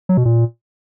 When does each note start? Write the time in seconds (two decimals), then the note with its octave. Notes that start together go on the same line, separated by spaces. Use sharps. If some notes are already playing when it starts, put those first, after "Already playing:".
0.09 F#3
0.17 B2
0.25 A#2